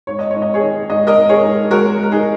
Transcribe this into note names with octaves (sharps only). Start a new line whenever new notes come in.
G#2 C#5
D#5
G#2 C#5
D#5
G#4 C#5
D#3
G#2 D#5
A#4 D#5
G#2
G#4 C#5
G#2
G#3 F#4 A#4
G#3
A#4
D#4 G#4